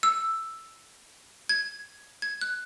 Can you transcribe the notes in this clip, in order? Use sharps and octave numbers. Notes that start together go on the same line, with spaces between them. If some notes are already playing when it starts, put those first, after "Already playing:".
E6
G#6
G#6
F#6